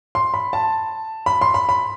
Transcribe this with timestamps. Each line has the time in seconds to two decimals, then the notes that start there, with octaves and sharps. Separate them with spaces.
0.15 C6
0.34 B5
0.53 A5
1.26 B5
1.41 C6
1.54 B5
1.69 B5